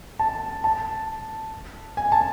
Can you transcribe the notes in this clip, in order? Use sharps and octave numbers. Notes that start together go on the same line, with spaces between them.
A5
A5
G#5
A5